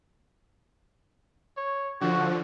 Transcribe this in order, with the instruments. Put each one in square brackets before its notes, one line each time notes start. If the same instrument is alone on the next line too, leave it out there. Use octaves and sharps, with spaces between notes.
[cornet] C#5
[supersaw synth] D3 F3 [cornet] F#4